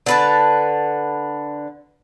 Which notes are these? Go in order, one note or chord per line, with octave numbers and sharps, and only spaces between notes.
D3 B4 A5